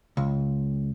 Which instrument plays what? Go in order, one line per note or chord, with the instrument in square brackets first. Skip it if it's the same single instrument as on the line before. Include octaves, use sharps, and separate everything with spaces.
[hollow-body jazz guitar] C#2